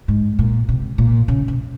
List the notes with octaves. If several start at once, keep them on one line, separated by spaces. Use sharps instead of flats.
G#2
A#2
C3
A#2
C#3
C3